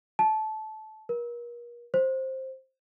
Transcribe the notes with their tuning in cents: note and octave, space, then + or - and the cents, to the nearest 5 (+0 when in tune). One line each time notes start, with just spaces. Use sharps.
A5 -20
A#4 +40
C5 +10